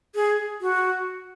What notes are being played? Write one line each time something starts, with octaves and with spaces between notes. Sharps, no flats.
G#4
F#4